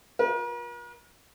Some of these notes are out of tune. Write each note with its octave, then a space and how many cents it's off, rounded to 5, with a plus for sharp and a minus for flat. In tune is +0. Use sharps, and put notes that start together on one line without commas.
F4 +45 A#4 +45